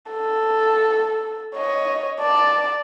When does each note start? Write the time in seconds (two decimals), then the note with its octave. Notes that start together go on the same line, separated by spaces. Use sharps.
0.12 A4
1.56 C#5 D#5
2.21 D5 A5